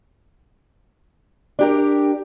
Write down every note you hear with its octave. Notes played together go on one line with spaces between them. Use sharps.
D4 G4 A#4